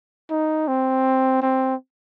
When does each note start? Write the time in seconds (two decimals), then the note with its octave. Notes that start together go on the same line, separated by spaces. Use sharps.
0.30 D#4
0.68 C4
1.42 C4